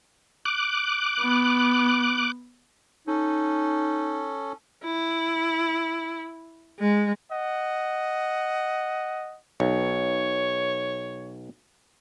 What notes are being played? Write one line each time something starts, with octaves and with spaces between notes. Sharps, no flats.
D6 F#6
B3
C#4 D#4 A4
E4
G#3
D#5 F#5
B1 C#5